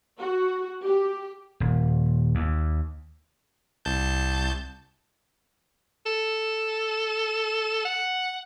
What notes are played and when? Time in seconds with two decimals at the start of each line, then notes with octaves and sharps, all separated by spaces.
0.19 F#4
0.83 G4
1.60 D#1
2.35 D#2
3.85 C2 A5 G6
6.06 A4
7.85 F#5